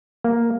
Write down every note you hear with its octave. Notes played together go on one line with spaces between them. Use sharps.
A#3